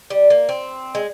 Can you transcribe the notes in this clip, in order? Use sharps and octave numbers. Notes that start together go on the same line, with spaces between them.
G3
A#3
C4
G#3